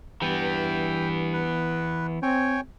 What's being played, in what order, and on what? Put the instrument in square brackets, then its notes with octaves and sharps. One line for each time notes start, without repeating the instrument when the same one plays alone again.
[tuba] G2 [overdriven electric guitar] E3 B3 [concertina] G5
[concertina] B4
[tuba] C4 [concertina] C#5 G5 G#5